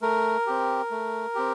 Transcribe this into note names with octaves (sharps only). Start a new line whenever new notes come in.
A3 A#4
C4 G4
A3
C4 G4